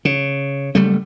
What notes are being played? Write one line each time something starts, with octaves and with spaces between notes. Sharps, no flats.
C#3
F#1 G3 A3